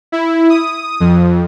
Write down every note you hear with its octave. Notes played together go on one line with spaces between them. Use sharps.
E4
D#6
F2